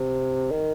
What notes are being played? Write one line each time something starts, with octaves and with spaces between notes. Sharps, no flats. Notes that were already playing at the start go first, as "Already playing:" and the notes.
Already playing: C3
D#3